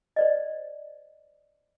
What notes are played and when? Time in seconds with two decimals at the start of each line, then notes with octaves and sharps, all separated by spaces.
0.16 C5 D5 D#5